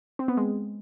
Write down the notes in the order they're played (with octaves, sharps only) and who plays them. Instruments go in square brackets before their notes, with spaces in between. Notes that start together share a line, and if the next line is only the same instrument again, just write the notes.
[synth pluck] C4
B3
G#3